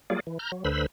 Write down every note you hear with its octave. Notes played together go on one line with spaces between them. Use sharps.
F#3 G3 A#3 F4 G#4 D5
E3
A#5 F6 G6
F#3
D2 D3 B4 C5 B5 E6